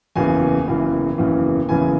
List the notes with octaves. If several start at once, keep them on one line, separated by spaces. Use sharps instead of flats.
F#1 E2 C#3 E3 G#5
F#1 E2 C#3 E3
F#1 E2 C#3 E3
F#1 E2 C#3 E3 G#5